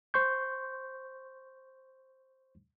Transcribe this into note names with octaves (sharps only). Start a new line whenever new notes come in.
C5 C6 C#6 G6